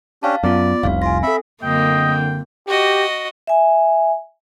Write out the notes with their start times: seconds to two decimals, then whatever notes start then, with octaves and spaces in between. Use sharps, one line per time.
0.23 C#4 D4 G4 F5 A5
0.44 F#2 B3 F4 D5
0.83 F1 C2 F5
1.02 F4 G#5 A#6
1.23 C4 A4 E5 B5
1.63 F#2 D3 A#3 C4 D#5 G5
2.67 F#4 G4 D#5
3.47 E5 G#5